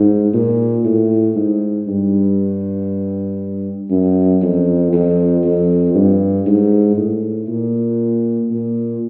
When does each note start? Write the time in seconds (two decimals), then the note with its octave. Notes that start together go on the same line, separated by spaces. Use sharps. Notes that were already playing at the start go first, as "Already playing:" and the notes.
Already playing: G#2
0.34 A#2
0.85 A2
1.36 G#2
1.87 G2
3.90 F#2
4.42 F2
4.93 F2
5.44 F2
5.95 G2
6.46 G#2
6.96 A2
7.48 A#2
8.50 A#2